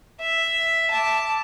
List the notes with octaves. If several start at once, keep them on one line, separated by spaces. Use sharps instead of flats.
E5
A5 D6